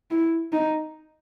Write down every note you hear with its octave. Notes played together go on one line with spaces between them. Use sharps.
E4
D#4